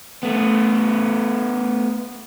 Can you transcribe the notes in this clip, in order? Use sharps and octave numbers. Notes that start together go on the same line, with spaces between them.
A3 B3